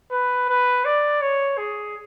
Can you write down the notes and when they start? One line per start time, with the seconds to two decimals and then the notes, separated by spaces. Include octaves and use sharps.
0.11 B4
0.49 B4
0.85 D5
1.21 C#5
1.58 G#4